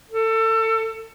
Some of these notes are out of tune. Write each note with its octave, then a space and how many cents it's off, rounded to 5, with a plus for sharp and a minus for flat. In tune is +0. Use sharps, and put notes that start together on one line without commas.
A4 +25